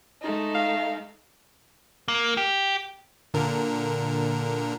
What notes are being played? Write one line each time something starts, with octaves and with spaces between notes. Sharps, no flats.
G#3 A3 D#4
F5
A#3
G4
A#2 D3 A#4